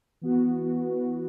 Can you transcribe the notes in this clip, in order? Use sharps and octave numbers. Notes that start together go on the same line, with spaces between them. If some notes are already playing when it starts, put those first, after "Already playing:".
E3 B3 F#4